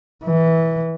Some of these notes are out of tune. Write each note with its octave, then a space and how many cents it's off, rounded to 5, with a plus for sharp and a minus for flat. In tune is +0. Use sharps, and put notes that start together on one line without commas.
E3 -15